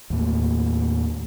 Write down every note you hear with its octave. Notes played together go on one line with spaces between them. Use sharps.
D#2 A2 A#3